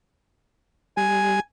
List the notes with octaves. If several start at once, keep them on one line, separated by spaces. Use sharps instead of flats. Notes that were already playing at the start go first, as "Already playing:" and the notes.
G3 G#5